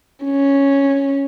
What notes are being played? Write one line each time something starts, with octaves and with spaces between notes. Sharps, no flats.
C#4